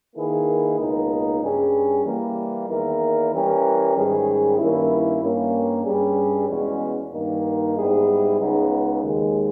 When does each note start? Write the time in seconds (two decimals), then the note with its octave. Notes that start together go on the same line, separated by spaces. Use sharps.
0.14 D#3 A#3 E4 G#4 B4
0.78 C#2 B2 A#3 D#4
1.41 G2 G3 C#4 G#4
2.05 E3 G3 A#3
2.68 E2 D#3 A#3 E4 A#4
3.31 E3 G3 C#4 G4 A#4
3.95 G#2 D#3 G3 C#4 G#4
4.58 G2 D#3 A#3 C#4 E4
5.21 G2 G3 A#3 C#4
5.84 G2 G3 C#4 G#4
6.48 E2 B2 G#3 C#4
7.12 G2 D#3 A#3 D#4
7.76 G#2 G3 B3 E4 G#4
8.38 C#2 C#3 G#3 B3 D#4
9.03 D#2 D#3 G#3